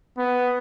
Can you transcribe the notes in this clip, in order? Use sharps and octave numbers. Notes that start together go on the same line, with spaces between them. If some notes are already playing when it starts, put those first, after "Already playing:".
B3